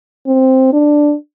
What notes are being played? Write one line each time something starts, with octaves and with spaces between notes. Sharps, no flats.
C4
D4